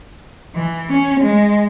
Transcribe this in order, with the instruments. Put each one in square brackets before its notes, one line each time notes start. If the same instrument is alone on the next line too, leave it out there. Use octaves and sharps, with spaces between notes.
[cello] E3
C#4
G#3